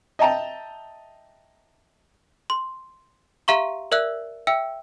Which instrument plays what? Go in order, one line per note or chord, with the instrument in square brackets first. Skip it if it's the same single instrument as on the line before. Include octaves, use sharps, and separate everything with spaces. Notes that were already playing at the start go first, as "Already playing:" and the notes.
[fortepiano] D#5 E5 G5 A5 A#5
[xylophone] C6
G4 E5 F5 A#5 C6 C#6
A#4 D5 E5 E6 F#6
E5 G5 E6